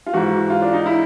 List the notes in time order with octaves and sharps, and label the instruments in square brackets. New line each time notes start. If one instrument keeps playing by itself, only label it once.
[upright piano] F4
G#2 E3 F#4
F4
D4
D#4
E4